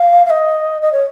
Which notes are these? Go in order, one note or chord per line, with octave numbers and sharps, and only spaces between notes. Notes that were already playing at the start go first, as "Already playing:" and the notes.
Already playing: F5
F5
D#5
D#5
C#5